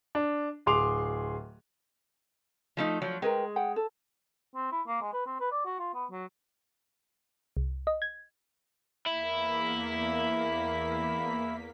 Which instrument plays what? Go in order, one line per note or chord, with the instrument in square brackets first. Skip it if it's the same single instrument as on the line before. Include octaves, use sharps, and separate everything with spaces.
[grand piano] D4
D1 G#4 C6 D6 F7
[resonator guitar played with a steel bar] F3 A3 D#4
F3 F#3
[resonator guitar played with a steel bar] G#3 [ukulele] A#4 B4 G5
[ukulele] F#5 G5
A4
[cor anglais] C4
E4
A#3
G#3
B4
C4
B4
D5
F#4
F4
B3
F#3
[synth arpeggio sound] C2
D#5
G#6
[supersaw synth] E2 A#3 B6 [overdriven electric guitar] E4